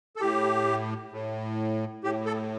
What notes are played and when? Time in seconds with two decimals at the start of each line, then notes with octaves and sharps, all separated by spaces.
0.16 A4
0.21 A2 G4
1.12 A2
2.04 A2 G4
2.26 A4